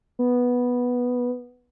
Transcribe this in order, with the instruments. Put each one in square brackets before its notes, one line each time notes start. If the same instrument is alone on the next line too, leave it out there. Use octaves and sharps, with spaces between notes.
[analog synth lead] B3